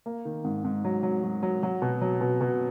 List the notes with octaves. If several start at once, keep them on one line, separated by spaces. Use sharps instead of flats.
A#3
D#3
G#2
G#2
F#3
F#3
F#3
F#3
F#3
B2
F#3
B2
B2